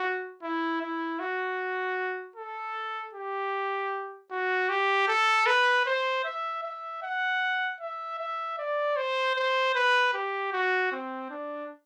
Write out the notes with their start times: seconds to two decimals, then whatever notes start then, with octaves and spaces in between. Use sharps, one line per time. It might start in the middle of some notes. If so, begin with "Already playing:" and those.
Already playing: F#4
0.42 E4
0.81 E4
1.20 F#4
2.36 A4
3.13 G4
4.31 F#4
4.69 G4
5.08 A4
5.47 B4
5.85 C5
6.24 E5
6.63 E5
7.02 F#5
7.81 E5
8.19 E5
8.59 D5
8.96 C5
9.35 C5
9.75 B4
10.14 G4
10.53 F#4
10.92 C4
11.30 D4